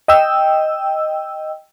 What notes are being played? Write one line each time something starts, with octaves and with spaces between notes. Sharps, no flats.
D#5 G5 E6